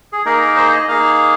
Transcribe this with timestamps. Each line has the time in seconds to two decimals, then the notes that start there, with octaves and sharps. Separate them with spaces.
0.12 G#4
0.25 A#3 D#4 G#4 A#4
0.42 A#4
0.56 C5
0.73 D#5
0.88 A#3 D#4 G#4 F5